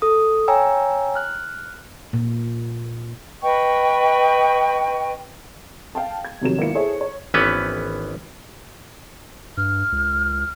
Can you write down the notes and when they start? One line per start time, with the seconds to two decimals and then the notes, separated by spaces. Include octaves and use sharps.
0.02 A4 D#6
0.48 C#5 G5 G#5 A#5 E6
1.15 F6 F#6
2.13 A#2
3.43 B4 D#5 G5 C#6
5.95 F5 G5 A5
6.25 G#6
6.42 F2 C3 D#3 F#3 E7
6.58 G#1 A#3 B3 E4 F4 C#7
6.75 E4 G#4 A4 C5 C#5 E5
7.01 C#5
7.34 G#1 E3 B3 C#4 B4
9.57 G2 F6
9.92 C#2